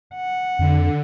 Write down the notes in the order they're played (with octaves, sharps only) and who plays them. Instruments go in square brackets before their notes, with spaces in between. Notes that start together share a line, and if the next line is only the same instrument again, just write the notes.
[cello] F#5
[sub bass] F2 [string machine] D3